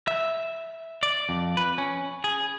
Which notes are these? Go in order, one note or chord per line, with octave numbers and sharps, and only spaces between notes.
E5
D5
F2
B4
C#4
G#4